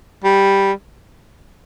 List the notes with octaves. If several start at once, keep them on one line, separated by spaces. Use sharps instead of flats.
G3